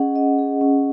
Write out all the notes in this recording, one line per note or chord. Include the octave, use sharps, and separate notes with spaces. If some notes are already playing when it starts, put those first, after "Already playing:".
Already playing: C#4 G#4 D#5 F#5
D#5
G#4
C#4